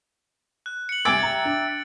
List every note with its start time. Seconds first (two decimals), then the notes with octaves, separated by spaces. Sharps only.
0.66 F#6
0.89 C#7 F#7
1.05 C2 E5 G5 G#5 D6 G#6 A6 D7
1.23 A#5
1.45 D4